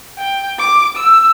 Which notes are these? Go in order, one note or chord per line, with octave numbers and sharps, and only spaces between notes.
G5
D6
E6